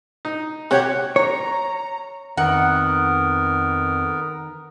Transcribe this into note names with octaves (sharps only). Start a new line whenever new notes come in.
D#4
C3 F#4 G4 C#5
C#5 A#5
F2 D#3 B3 A#4 F#5